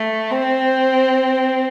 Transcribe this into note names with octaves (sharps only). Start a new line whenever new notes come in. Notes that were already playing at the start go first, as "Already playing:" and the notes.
Already playing: A3
C4